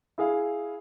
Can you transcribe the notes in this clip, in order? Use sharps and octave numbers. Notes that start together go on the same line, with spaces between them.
E4 G#4 F5